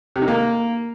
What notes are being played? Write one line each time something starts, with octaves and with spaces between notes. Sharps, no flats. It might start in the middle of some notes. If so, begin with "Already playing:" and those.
C3
D#3
A#3